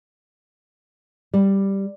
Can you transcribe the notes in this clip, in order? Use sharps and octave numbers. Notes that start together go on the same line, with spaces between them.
G3